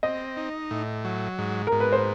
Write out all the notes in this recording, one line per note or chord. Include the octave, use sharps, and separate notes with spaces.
C4 D#5
D#4
A2
F#3
G#2
G#2 A#4
B4
C5